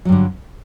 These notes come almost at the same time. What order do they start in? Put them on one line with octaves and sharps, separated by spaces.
F#3 G2 D3